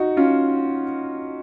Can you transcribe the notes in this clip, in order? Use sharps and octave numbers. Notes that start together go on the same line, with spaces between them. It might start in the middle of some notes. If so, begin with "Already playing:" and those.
Already playing: D#4 F#4
C#4 F4